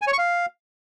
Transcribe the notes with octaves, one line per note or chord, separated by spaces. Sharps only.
G#5
C#5
C#6
F5